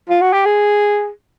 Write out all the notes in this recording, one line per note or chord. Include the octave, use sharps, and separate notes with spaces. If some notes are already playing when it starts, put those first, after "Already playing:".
F4
F#4
G4
G#4